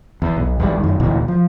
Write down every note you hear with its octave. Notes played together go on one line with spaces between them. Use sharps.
E2
B1
G#1 E2 C3 G3
F#2 D#3
D#1 D2 B2 E3
F3